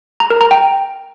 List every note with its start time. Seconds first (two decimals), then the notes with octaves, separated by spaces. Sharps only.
0.20 A#5
0.30 A#4
0.41 A#5
0.51 G5